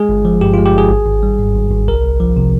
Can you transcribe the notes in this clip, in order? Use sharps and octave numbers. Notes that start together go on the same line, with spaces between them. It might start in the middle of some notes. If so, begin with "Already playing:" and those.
Already playing: G#3 G#4
G1
F3
G2 G4
G#3 F4
G4
G1 G#4
G#1
G#1
G3
G#2
G#1
G#1
C2 A#4
C2
F3
C3